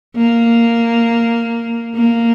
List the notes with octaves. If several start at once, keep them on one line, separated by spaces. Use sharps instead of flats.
A#3
A#3